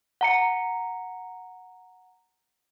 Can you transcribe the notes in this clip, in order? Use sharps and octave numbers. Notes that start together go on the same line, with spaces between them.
F#5 A#5 C#7